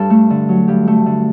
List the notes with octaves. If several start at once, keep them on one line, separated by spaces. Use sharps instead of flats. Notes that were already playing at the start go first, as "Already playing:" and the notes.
Already playing: G2 A4
A3
D3
F#3
G2 G4
A3
D3